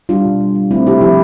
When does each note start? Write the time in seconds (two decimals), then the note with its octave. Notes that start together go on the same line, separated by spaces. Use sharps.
0.09 G3 D4 F4
0.25 B2
0.40 G3
0.55 G3
0.71 A3 C4 E4
0.86 C3 E4 G4
1.01 F3 E4 G4